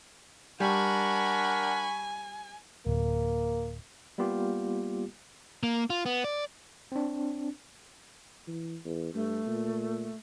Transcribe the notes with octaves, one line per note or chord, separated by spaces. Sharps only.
G3 D4 A#4 F#5 G#5 B5 C#6
D1 A#3
G3 A#3 B3 F4 G4
A#3
F4
B3
D5
C4 D4
E3
E2
G2 A3
A#2